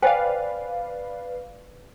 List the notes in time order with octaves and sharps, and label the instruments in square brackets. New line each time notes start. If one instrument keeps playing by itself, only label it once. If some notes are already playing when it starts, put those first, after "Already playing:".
[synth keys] B4 D5 F5 [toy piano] C5 G5 G#5